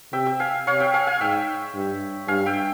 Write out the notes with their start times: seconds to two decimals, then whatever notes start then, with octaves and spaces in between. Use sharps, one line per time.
0.13 C3 E5 G5
0.26 E5 G5
0.40 F5 G#5
0.67 C3 C#5 F5
0.80 E5 G5
0.94 F5 G#5
1.07 F5 G#5
1.20 G#2 E5 G5
1.75 G2
2.28 G2 F5 G#5
2.46 E5 G5